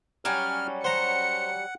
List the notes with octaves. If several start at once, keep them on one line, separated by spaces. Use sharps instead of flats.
F#3 G3 C#4 F6
C5 F#5 A#5 C#7